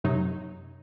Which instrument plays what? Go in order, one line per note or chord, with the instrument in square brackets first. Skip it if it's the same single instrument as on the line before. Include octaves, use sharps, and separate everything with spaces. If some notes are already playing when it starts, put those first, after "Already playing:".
[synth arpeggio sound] F#2 C3 F#3 D#4